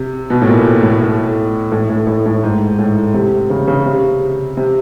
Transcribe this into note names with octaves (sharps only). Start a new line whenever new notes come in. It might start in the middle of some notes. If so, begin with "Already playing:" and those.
Already playing: C3
B2
A2
A#2
A2
A2
A2
A2
A2
A2
G#2
A2
C3
C#3
C#3
C3
C3